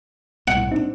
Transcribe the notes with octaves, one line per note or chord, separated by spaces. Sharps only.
C2 A2 F#5
C4 D4 D#4